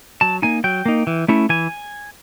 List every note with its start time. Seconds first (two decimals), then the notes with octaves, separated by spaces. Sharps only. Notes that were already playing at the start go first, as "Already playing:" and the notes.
0.21 F#3 A5
0.42 A#3 D#4 G#5
0.64 F#3 G5
0.86 A#3 D#4
1.07 E3
1.28 A3 C#4 E4
1.49 E3 G#5